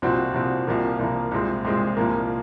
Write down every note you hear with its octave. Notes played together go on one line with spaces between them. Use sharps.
C2 A#2 F3 C4 F#4
C2 A#2 F3 C4 F#4
C2 A#2 F3 A#3
C2 A#2 F3 A#3
C2 A#2 G#3 C4
C2 A#2 G#3 C4
C2 A#2 F3 A#3